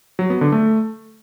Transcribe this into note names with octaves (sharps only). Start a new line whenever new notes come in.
F#3
B3
D3
A3